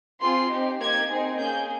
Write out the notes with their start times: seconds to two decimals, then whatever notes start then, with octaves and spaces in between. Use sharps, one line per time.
0.21 C4 F4 G#4 C6
0.50 C4 D#4 G4
0.80 A#3 D#4 G4 G#6
1.10 C4 D#4 G#4
1.39 A#3 C#4 G#4 G6